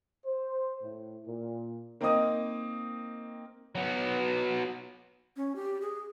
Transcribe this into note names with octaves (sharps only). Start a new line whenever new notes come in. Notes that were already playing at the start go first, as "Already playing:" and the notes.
C5
A2
A#2
A#3 C4 D#4 A#4 D#5 D#6
F#3 B3
C#4
G4
G#4